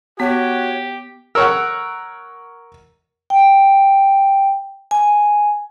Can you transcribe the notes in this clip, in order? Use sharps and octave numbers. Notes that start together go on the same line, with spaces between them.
B3 F#4 G4 C#5
A#4 C#5 F#5 E6
G5
G#5